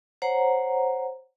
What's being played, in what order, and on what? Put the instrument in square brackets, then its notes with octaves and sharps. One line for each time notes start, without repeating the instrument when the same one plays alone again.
[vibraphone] C5 C#5 F#5 A#5